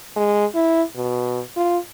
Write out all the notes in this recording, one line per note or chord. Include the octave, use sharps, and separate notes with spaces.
G#3
E4
B2
F4